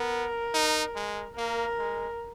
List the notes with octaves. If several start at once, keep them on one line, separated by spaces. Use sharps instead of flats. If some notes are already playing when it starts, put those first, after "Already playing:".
Already playing: B3 A#4
D#4
G#3
A#3 A#4
G#3